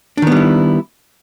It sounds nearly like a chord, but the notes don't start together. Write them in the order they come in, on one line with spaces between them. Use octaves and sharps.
D4 D#3 B3 G3 E4